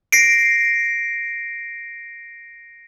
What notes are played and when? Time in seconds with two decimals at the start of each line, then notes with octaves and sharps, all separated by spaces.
0.12 A#6 C7 D7